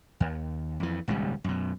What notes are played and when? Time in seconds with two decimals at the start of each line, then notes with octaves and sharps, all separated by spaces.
0.20 D#2
0.80 F2 E3
1.08 D#1 C#2 G#2 G3
1.44 F#2 B2